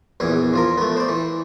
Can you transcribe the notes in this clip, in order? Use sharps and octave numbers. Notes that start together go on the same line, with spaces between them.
A#1 E2 E3 G#4
F3 F4 A#4
A3 B3
C5 D5
E3